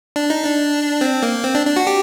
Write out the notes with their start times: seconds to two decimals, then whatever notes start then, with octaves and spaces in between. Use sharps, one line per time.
0.16 D4
0.30 D#4
0.44 D4
1.01 C4
1.23 A#3
1.44 C4
1.55 D4
1.66 D4
1.76 F#4
1.87 G4